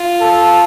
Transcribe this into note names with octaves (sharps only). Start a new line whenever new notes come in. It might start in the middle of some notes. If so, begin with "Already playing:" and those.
Already playing: F4
A4